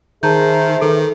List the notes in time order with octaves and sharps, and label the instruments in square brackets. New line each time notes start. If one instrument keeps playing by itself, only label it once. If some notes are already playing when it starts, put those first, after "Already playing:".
[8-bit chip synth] D#3 [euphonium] G#4 [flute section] A#4 C5 E5 [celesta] A5 A#5 G6
[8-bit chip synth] D#3 [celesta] A4 [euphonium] B4